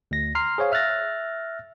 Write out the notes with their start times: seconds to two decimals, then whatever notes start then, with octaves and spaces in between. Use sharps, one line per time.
0.11 D2 A#6
0.35 A#5 C6 F6 C7
0.58 G#4 C5 C#5 F5
0.72 E5 F6 F#6 A6 A#6